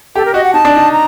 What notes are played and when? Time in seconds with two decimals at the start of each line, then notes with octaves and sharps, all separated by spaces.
0.16 G4 A4
0.25 A#4
0.34 F#4 D#5
0.44 F#5
0.54 D#4 A5
0.65 D4
0.76 D#4
0.92 A#5